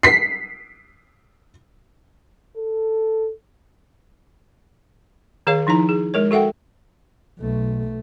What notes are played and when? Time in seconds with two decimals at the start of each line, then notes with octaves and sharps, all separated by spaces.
0.03 B6 C7
2.57 A4
5.47 D#3 G#4 C#5 F5
5.67 F3 D#4 E4 A#5
5.89 G#4
6.14 G#3 A#4 C#5
6.31 F#4 A4 E5 F#5 G5
7.39 B1 A3